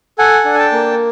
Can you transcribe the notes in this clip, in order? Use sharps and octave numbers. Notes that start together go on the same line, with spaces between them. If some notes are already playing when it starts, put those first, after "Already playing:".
A4 F#5 G#5
D4
G#5
G5 A5
A#3